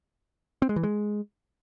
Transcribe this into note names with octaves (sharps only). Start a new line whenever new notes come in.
C4
G#3
E3
G#3